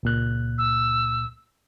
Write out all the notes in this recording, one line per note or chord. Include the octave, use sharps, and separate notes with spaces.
C#2 A#2 F#6
E6